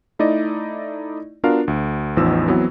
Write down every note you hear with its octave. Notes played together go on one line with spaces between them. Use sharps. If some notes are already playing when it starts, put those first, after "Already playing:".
A3 D#4 E4 D5 D#5
B3 D4 F4 F#4 A#4 F5
D2
A1 E2 F3 D#4 E6
E3 F#3 B3 C4